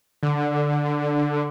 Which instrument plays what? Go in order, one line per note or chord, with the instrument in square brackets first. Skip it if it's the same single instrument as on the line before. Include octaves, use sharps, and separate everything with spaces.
[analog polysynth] D3